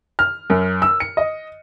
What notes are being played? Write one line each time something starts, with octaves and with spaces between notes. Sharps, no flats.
F6
F#2
E6
C#7
D#5